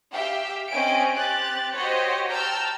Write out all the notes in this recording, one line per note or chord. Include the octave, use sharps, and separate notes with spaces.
G4 E5 F5 G5
C4 C#4 D#5 G#5 D7
C4 G4 F#6 A6
F#4 G4 C5 C#5 D#5
G5 A5 A#5 E6 F6 G6